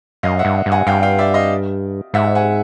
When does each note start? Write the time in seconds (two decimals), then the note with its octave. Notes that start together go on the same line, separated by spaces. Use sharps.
0.23 F#2 D#5 F5
0.39 E5 F#5
0.45 G2
0.66 G2
0.72 F#5 G#5
0.87 G2 F5 G5
1.03 F5 G5
1.18 D5 E5
1.34 D#5 F5
2.14 G#2 E5 F#5
2.35 F#5 G#5